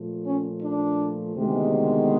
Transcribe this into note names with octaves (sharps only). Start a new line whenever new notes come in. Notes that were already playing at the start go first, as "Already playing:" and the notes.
Already playing: A#2 F3 A3
C#4
D4
D2 C3 D#3 G#3 B3